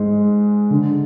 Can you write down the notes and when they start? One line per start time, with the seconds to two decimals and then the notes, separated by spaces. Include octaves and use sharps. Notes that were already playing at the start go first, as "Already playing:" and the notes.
Already playing: G#2 G#3
0.71 D3